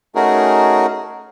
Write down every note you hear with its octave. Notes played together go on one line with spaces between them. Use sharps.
A3 C#4 D#4 F#4 G#4 A#4